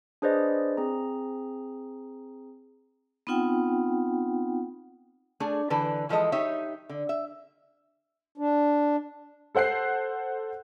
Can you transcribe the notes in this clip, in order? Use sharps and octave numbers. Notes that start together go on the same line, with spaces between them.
D4 G#4 B4 C5 D5 D#5
C4 G#4 A#5
B3 C4 D#4 F4 F#5 G5
A3 D4 G#4
D3 E3 B4 A5
E3 F3 G#3 A4 D#5
D#4 G4 C#5 E5
D3
E5
D4
A4 C5 F#5 F#6 C7